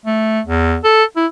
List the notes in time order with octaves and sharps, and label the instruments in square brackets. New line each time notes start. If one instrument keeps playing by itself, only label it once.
[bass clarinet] A3
E2
A4
E4